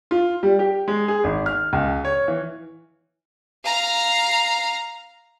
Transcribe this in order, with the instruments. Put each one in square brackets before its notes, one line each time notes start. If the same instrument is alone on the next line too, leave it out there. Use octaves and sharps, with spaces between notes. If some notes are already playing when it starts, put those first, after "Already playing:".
[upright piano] F4
G3
G4
G#3
G#4
G#1
F6
C#2
C#5
E3
[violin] F5 A#5